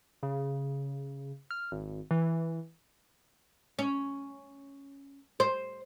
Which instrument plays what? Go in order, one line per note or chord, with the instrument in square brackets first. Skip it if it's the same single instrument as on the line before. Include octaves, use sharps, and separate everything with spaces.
[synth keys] C#3
F6
G#1
E3
[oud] C#4
C5